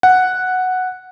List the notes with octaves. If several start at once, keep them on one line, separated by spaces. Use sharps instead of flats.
F#5